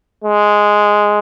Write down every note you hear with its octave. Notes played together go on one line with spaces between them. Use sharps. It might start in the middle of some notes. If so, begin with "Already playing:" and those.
G#3